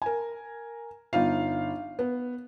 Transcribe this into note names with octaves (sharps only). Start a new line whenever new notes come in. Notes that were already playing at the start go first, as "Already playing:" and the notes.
A#4 G#5
G1 D#4 F4 F5
B3